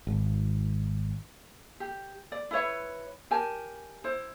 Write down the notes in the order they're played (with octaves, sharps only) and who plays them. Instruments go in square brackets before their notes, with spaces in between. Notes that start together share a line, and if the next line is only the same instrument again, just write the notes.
[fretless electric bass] G#1
[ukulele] G4
D5
E4 B4 C#5 E5
G4 A#4 G#5 A5
E4 C5